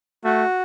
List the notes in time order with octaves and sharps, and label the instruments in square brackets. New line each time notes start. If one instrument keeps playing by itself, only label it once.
[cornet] A3 [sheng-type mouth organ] F#4